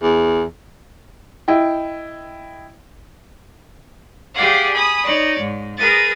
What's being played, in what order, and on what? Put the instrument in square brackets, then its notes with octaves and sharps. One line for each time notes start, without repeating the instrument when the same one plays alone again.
[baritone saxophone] E2
[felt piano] E4 D#5 G5
[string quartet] G4 G#4 D5 F5 F#5
G#5 B5 D#6
D#4 C#5 D5
G#2
G#4 A#4 B4 D#6 A6